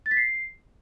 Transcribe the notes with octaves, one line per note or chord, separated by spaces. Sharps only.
A6
B6
C7